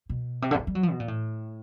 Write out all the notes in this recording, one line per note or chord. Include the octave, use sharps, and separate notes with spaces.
B2
C3
D3
C3
C#3
G3
F#3
F3
B2
A#2
A2